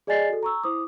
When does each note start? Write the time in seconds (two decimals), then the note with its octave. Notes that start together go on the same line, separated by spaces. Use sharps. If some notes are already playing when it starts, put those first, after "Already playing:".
0.07 G#4 D5 D#5 G#5 A6 C7
0.29 F#4 A4
0.43 A#5 C#6 E6
0.64 E4 C5 D6 D#6